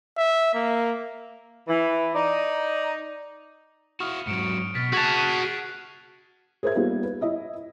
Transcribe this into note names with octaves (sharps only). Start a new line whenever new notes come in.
E5
A#3
E3
D#4 D5
E4 F#4 C#6 D#6 F6
G#2 F#3 C#7 D7 E7
B2 F6 A6 B6
F#4 G#4 G#5 A5 F#6 G#6 F7
G#4 A#4 C5 E5 G#6
G3 A#3 B3 D#4 F4 G4
B4
E4 D#5 E5